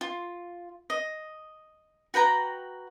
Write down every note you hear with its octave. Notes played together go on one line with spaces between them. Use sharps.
F4
D#5
F#4 B4 G5 A#5